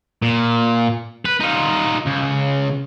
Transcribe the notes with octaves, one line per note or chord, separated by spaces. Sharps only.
A#2
B4
D#4 F4
C#2